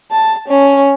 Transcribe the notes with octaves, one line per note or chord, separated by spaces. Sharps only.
A5
C#4